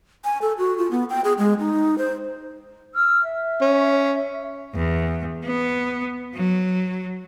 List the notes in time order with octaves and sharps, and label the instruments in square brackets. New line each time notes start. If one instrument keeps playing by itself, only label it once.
[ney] G#5
A4
F#4
F4
B3
G5
G#4
G#3
D#4
C5
[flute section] E6 F6
E5
[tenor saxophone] C#4
[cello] E2
B3
F#3